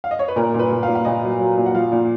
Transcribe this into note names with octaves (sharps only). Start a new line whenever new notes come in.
F5
D#5
C#5
B4
A#2 A#4
A#2
B4
A#2
F5
A#2
F5
A#2 D#5
F#3
F#3
A#2
F#5
F3 F5
A#2